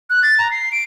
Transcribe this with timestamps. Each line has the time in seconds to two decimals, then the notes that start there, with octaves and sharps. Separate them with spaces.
0.10 F#6
0.23 A6
0.39 A#5
0.51 C7
0.72 D7